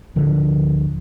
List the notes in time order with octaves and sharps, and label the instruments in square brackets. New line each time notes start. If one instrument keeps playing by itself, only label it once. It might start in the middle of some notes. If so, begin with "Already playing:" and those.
[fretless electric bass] D1 D3 F3